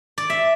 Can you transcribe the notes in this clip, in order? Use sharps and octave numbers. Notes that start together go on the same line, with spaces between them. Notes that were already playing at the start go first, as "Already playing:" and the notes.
D5
E5